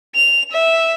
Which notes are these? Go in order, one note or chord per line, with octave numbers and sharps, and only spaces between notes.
F7
E5